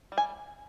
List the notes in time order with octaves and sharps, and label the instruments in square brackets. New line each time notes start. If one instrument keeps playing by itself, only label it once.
[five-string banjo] G3
G#5